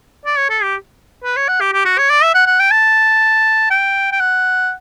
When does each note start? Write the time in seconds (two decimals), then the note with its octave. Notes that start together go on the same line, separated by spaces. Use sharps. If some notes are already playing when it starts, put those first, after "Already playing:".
0.26 D5
0.38 C#5
0.50 A4
0.62 G4
1.24 B4
1.37 C#5
1.48 F#5
1.61 G4
1.73 G4
1.85 F#4
1.98 C#5
2.10 D5
2.23 E5
2.35 F#5
2.47 F#5
2.60 G5
2.71 A5
3.71 G5
4.12 G5
4.20 F#5